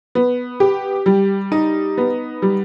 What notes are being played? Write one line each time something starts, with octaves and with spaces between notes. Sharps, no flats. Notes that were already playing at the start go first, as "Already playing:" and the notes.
B3
G4
G3
D#4
B3
G3